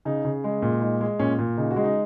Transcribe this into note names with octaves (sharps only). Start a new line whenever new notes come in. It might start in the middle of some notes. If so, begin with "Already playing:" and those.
C#3 D#4
C#3
G#3
A#2
G#3 D#4
G#3
A#2 C#4
A#2
C#3 D#4
F#4
G#3
D#4